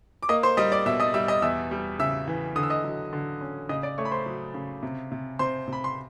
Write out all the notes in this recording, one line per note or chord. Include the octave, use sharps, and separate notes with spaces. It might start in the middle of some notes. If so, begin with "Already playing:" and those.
D6
A#3 D#5 D#6
C5 C6
G3 D#5 D#6
D5 D6
B2 E5 E6
D#5 D#6
G3 E5 E6
D#5 D#6
E2 E5 E6
G3
C#3 E5 E6
E3
D3 D#6
E6
D#5 D#6
F#3
D3
C#4
C#3 D#5 D#6
D5 D6
A3 C#5 C#6
B5
C5 C6
F#3
C#3
C3
C3
C3 C5 C6
C3
B5
C6